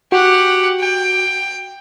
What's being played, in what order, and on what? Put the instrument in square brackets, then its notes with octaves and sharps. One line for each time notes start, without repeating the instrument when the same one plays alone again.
[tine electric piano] F#4 [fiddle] G4 F#5
[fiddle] G5